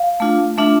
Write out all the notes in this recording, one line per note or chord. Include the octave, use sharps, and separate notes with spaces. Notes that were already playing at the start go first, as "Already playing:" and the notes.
Already playing: F5
A3 D4 F4
A3 D4 F4 E5